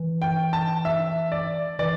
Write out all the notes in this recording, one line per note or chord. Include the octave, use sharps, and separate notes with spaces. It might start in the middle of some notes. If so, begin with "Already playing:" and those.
Already playing: E3
G5
A5
E5
D5
E3 D5